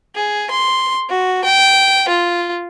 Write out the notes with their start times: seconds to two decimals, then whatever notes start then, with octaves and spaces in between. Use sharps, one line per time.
0.15 G#4
0.50 C6
1.09 F#4
1.44 G5
2.08 F4